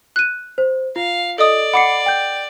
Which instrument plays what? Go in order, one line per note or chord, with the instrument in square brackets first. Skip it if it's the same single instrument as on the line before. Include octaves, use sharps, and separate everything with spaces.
[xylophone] F#6 D#7
[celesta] C5
[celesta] F4 [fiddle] F5
[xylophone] A4 D#5 D#6 [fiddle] D5
[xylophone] F#5 D6 C#7 [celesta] B5 C7
[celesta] G5 G6